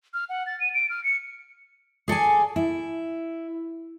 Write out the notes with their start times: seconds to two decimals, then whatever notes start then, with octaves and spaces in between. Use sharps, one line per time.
0.14 F6
0.29 F#5
0.47 A6
0.60 D#7
0.74 D7
0.90 F6
1.04 C#7
2.08 G#4 A4 D5 G#5
2.56 E4